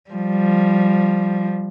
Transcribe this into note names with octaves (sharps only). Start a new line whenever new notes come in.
F3 G3